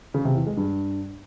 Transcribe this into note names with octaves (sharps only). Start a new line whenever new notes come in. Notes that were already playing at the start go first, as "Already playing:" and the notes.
C#3
C3
E2
G#3
G2